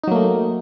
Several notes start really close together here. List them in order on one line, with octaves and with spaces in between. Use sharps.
D#4 F#3 A#3 A3